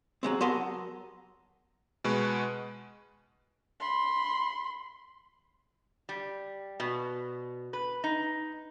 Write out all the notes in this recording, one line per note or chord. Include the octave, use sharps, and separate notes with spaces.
F#3 G#3 C4
F#3 B3 A#4 G#5 A5 C6
B2 G#3 B4 C#6
B5 C6
G3
B2
B4
D#4